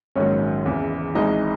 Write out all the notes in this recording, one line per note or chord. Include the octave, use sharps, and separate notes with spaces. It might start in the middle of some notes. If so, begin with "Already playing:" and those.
A#1 G#2 D#3 F#3 C#4 C#5
E2 C#3 E3
G#1 G#2 E3 G#3 D#4 D#5